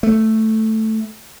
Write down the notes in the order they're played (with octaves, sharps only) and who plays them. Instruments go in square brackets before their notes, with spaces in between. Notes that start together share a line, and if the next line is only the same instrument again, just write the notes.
[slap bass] A3